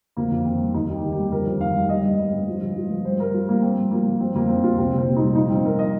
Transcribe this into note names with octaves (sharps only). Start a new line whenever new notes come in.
F2 A#3
F2
D#3 C4
G3
D#2 D#4
D#2 G4
D#3
G4
G3
F2 A#4
F2
D#3 F5
G3
G3 D#5
G2
G3
G2
F3
G2
F3
G2
G3 C5
G2 A#4
G3 F4
G2 A#3
F3 C4
G2
F3 A#3
G2
F3 C4
F2 A#3
F3 C4
F2 F4
C2 C4
C2
C4
A#2
D#4
G3
F3 D#4
G2 C4
F3 A#4
D#5